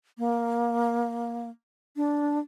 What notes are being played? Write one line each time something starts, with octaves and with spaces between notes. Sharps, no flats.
A#3
D4